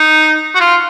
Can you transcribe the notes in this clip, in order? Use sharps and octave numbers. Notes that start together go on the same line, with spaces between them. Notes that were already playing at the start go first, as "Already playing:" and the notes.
Already playing: D#4
F#4
F4